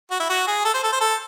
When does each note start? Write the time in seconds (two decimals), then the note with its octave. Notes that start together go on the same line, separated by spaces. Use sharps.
0.11 F#4
0.20 E4
0.29 F#4
0.47 G#4
0.65 A4
0.74 C5
0.84 A4
0.93 C5
1.01 A4